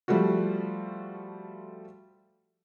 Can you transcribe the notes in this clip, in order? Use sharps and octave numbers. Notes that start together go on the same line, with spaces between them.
F3 G3 A3 F4 F#4